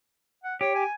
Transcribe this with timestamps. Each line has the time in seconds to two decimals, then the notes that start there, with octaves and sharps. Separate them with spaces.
0.44 F#5
0.61 G4 C#5
0.75 G#5